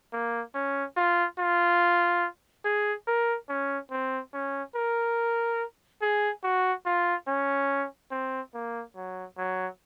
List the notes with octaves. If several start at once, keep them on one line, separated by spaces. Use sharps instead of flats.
A#3
C#4
F4
F4
G#4
A#4
C#4
C4
C#4
A#4
G#4
F#4
F4
C#4
C4
A#3
F#3
F#3